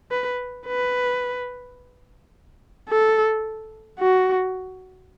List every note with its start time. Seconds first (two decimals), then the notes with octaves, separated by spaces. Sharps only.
0.11 B4
0.67 B4
2.89 A4
4.00 F#4